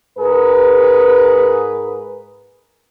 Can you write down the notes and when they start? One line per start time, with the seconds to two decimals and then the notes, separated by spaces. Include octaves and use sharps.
0.18 G#2 G#4 A#4 B4